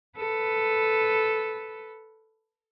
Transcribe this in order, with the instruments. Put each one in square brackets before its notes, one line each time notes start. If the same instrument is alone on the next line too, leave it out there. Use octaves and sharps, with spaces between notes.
[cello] A4 B4